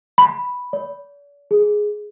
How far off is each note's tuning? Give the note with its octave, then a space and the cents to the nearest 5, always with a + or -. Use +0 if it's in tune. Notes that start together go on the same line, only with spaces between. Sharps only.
B5 +0
D5 -45
G#4 +5